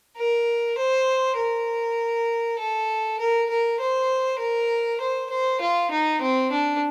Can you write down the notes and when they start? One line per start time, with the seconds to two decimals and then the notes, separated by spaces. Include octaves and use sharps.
0.18 A#4
0.78 C5
1.38 A#4
2.59 A4
3.20 A#4
3.50 A#4
3.80 C5
4.40 A#4
5.01 C5
5.30 C5
5.61 F4
5.91 D#4
6.22 C4
6.52 D4